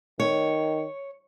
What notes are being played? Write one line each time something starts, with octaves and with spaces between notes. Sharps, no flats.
D#3 C#5